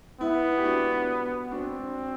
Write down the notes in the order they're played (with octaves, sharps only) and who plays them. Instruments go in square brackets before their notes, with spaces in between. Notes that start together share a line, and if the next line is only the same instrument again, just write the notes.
[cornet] B3 [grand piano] E4
[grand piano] G4
D4 F#4
[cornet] C4 [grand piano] D4 F#4